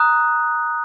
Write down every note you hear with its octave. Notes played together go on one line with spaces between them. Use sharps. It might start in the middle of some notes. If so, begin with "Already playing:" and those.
Already playing: A#5 D#6 F#6